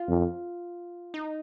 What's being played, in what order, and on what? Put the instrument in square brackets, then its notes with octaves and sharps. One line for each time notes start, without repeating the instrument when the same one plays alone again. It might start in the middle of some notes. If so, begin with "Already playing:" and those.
Already playing: [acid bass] F4
[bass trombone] F2
[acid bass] D#4